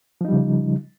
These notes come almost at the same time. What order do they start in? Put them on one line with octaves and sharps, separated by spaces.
F3 D#4 G3 C#3